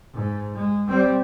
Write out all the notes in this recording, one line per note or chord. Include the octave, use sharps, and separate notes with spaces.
G#2
G#3
G3 C4